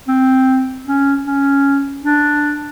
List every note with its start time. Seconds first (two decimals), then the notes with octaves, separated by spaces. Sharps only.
0.08 C4
0.87 C#4
1.26 C#4
2.04 D4